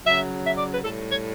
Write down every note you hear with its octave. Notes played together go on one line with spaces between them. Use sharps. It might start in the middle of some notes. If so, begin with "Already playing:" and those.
C#3 F#3 E5
E5
D5
B4
A2 G3 A4
C#5